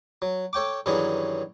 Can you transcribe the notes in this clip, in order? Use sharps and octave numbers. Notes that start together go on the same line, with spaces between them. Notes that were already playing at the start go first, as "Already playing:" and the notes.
F#3
A4 C#5 G5 D6
G2 D#3 E3 F#3 C#4 G#4